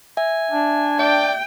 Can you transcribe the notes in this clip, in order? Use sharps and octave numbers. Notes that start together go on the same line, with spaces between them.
E5 G#5
D4
D5 E5 G5